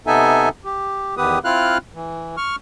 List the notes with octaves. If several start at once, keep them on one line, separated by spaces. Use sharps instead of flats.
C3 B3 D#4 A4 E5 G#5
G4
E2 D#3 B3 G4 B4 D#6
C4 E4 F4 F5 F6 F#6
E3
C#6 F6